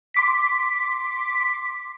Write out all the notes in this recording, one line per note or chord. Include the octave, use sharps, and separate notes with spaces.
C6 D6 B6